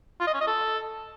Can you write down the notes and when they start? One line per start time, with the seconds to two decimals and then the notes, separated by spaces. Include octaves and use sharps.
0.20 F4
0.27 D#5
0.34 C#4
0.41 D#5
0.47 A4